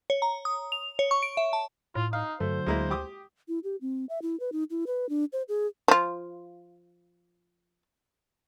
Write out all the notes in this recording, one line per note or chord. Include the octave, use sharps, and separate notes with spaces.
C#5
A#5
D#6
F7
C#5
C#6
D7
E5
A5
A2 F4
D#4 F5
G2 D3 F#3 A3 C5
D2 G#3 A#3 E4
G4 D6 D#6
E4
G4
C4
E5
E4
B4
D#4
E4
B4
D4
C5
G#4
F3 F4